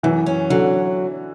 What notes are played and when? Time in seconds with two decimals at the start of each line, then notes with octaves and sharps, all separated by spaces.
0.03 F#2 E3
0.26 C#4
0.50 D3 F#3